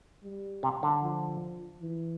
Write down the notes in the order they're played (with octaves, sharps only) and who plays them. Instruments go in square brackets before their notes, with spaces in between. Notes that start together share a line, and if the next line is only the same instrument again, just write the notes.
[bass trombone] G3
[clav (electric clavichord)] C3
D3
[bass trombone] F3
E3